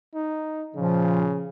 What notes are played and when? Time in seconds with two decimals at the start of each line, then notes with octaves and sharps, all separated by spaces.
0.14 D#4
0.75 A#2 C#3 F3